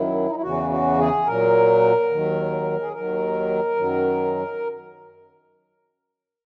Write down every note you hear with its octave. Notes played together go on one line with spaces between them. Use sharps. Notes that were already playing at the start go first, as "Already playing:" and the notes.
Already playing: F#2 D#3 F#3 E4
D#4
E4
E2 C#3 E3 F#4
F#4
G#4
A#2 F#3 A#4
D#2 D#3 F#3
G#4
D#2 D#3 F#3 A#4
F#2 D#3 F#3